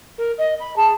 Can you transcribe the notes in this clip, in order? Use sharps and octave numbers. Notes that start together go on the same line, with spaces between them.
A#4
D#5
B5
G#4 A5